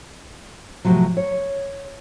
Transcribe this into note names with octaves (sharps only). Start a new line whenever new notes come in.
A2 C3 D#3 F3 F#3
C#5